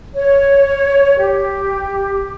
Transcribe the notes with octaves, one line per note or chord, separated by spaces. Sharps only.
C#5
G4